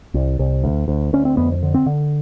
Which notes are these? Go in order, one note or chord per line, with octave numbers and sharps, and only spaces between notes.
C2
C2
D2
D2
D2 C#4
C4
F2 B3
D3
C4
D3